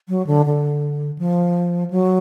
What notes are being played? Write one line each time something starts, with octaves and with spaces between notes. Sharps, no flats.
F#3
D3
D3
F3
F#3